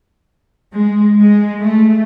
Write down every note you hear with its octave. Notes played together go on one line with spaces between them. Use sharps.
G#3
G#3
A3